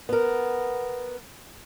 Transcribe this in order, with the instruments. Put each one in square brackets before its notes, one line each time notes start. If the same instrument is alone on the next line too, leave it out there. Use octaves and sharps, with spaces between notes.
[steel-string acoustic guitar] B3 A#4